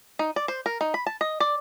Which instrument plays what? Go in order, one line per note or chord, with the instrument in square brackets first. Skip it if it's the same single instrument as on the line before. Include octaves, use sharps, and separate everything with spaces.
[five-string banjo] D#4
D5
C5
A#4
D#4
B5
A5
D#5
D5